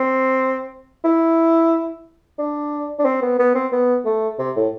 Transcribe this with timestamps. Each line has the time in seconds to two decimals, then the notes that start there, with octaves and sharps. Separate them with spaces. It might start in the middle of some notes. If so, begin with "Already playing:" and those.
Already playing: C4
1.04 E4
2.39 D4
2.99 D4
3.05 C4
3.22 B3
3.39 B3
3.55 C4
3.72 B3
4.05 A3
4.39 C3
4.56 A2